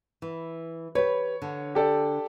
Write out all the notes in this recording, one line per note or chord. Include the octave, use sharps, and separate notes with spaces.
E3
G4 B4 C#5
D3
G4 A4 D5